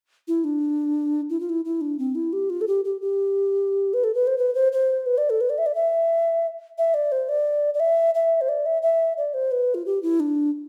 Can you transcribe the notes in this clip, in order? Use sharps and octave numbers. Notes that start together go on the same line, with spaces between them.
E4
D4
E4
F4
E4
E4
D4
C4
E4
G4
F4
A4
G4
G4
G4
B4
A4
B4
C5
B4
C5
C5
B4
D5
A4
B4
D5
E5
D5
E5
E5
D5
C5
D5
D5
E5
E5
C5
D5
E5
E5
D5
C5
B4
F4
G4
E4
D4